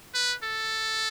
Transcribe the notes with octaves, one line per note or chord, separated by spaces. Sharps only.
B4
A4